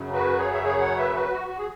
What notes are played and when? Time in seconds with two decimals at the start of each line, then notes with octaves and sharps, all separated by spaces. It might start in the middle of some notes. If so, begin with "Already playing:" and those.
Already playing: F#2 C#3 F#3
0.13 F#4 B4
0.38 G#4 C#5
0.53 E5
0.63 G#4 C#5
0.80 C#5 F#5
0.97 B4 E5
1.14 F#4 B4
1.30 F#4
1.48 F#4
1.58 G#4